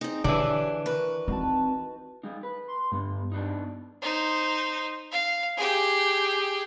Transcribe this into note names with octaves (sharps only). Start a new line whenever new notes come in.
G#3 C4 D#4
D3 E3 D4 G4 G#4 C#5
A#4 B4 C#6
C4 D#4 F#4 A5
G3 D#4
B4
C6
G2 G3 B3
B3 D4 D#4
D#4 C5
F5
G4 G#4